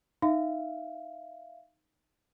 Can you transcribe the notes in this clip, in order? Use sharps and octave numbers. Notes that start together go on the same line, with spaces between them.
D#4 E5 F5